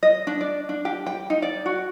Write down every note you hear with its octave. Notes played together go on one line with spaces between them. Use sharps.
D#5
D4
D5
D4
G4
G5
D#4
D5
F#4